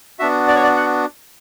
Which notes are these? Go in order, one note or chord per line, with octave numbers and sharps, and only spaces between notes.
B3 D4 F#4 E5
D5
C#5
D5
F#5